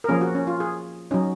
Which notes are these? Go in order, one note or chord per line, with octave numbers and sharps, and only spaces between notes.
A#4
F3 A#3 C#4 G#4
F#4
C#4
F4
G#4
F#3 C#4 D#4